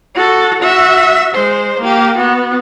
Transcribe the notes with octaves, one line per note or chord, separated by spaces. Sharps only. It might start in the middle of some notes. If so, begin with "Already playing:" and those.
F#4 A4
F#4 E5
G#3 C5
A#3 G4
B3 F#4